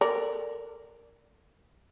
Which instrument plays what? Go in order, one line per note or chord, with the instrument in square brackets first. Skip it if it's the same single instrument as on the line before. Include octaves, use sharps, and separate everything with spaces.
[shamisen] A4 A#4 D5